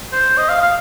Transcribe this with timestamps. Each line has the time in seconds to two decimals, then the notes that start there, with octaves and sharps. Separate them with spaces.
0.12 C5
0.38 D#5
0.49 F5
0.62 F5